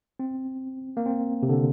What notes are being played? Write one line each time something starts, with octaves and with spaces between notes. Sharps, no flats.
C4
A#3
C4
C3
D3